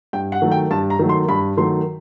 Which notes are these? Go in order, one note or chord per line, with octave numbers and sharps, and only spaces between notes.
G2 G5
F#5
D#3 F#3 A3
G5
G2 A5
A#5
D#3 F#3 A3
C6
G2 B5
D#3 F#3 A3 C6